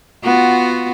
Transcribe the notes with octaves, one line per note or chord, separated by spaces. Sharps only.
B3 F4 F#4